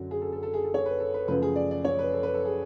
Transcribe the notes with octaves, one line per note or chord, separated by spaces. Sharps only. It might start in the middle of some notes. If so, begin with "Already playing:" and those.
Already playing: F#2 D3 F#3
G#4
A4
A4
A4
G#4
A4
C#5
B4
A4
B4
F#2 C#3 F3 A3 B4
G#4
D5
D5
C#5
B4
A4
B4
A4
G#4